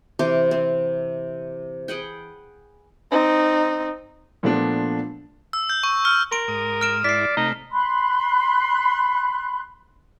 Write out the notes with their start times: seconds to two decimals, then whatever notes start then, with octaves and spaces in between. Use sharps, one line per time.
0.19 C3 E3 C5 D6
0.51 C4
1.88 G#4 B4 F#5 G5
3.11 C4 D#4
4.43 A#2 F3 A3 B3 D4
5.53 E6
5.70 G6
5.83 C#6
6.05 F6
6.32 A#4 C6 D7
6.48 G#2 D#6
6.81 F6 D7 E7
7.04 G#2 E4 D5 B6 C7
7.37 C3 A3 D#4
7.71 B5 C6 F#6